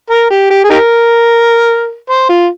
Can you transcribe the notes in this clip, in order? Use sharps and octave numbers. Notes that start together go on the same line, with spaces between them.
A#4
G4
G4
G#4
D#4 G4 A#4
C5
F4